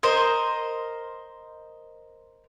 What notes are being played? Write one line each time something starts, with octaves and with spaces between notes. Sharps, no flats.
A#4 C5 D#5